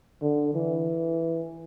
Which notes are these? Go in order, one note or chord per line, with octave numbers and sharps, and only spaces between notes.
D3
E3